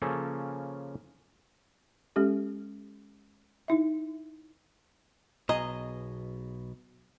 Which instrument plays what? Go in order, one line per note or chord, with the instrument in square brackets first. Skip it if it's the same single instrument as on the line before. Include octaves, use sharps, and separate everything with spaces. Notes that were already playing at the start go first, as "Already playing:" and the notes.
[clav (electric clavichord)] C#3 F3 A#3 C#4 A4
[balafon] G#3 C#4 G4 A4
D#4 E4 E5
[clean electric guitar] B1 B2 [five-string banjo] G#4 D#5 A#5